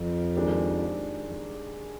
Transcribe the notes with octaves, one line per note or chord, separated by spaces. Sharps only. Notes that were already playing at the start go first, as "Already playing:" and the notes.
Already playing: F2
D#3 G#3 D4 G4 A#4
F2